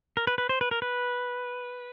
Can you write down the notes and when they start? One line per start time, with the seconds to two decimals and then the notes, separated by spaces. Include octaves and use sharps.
0.17 A#4
0.27 B4
0.38 B4
0.49 C5
0.61 B4
0.71 A#4
0.82 B4